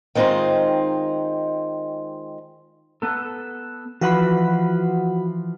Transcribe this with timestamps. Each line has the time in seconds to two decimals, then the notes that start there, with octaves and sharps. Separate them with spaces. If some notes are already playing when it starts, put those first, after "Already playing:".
0.15 D#3 G#3 C4 D#4 F4 C5
3.02 B3 A4
4.01 E3 F3 F#4 B4 F#5 B5